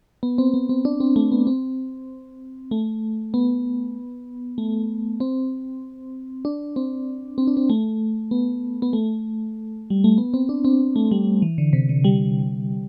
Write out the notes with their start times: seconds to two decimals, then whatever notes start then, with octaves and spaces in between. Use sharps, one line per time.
0.23 B3
0.38 C4
0.54 B3
0.69 C4
0.85 D4
1.00 C4
1.16 A3
1.32 B3
1.47 C4
2.71 A3
3.34 B3
4.58 A3
5.20 C4
6.45 D4
6.76 C4
7.38 C4
7.47 D4
7.57 C4
7.70 A3
8.31 B3
8.82 B3
8.93 A3
9.90 G3
10.04 A3
10.18 B3
10.34 C4
10.49 D4
10.65 C4
10.96 A3
11.11 G3
11.42 E3
11.58 D3
11.73 C3
11.89 D3
12.04 G3